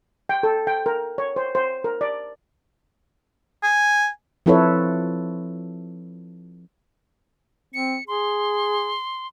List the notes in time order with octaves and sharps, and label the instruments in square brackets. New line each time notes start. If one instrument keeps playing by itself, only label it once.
[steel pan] G5
A4
G5
A#4
C#5
C5
C5
A#4
D5
[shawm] G#5
[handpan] F3 C4 E4 A4 B4 C#5
[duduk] C4 [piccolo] C#7
[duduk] G#4 [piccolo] C6